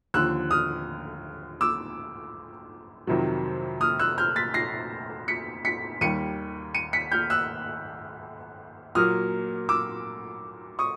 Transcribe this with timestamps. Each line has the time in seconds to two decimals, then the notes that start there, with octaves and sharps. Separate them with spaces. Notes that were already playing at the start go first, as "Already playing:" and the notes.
0.14 D#2 D3 F3 E6 F#6
0.51 D#6 F6
1.61 D6 E6
3.07 F2 C3 D#3 F#3
3.81 D#6 F6
3.99 E6 F#6
4.18 F6 G6
4.36 A6 B6
4.54 A#6 C7
5.28 B6 C#7
5.65 B6 C#7
6.01 D#2 D#3 G3 C#7 D#7
6.74 C#7 D#7
6.93 B6 C#7
7.11 F6 G6
7.30 E6 F#6
8.95 A#2 F#3 A#3 D#6 F6
9.69 D6 E6
10.79 C#6 D#6